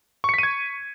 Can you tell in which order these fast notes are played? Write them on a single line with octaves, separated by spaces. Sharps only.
C#6 C#7 B6 D#7 G#6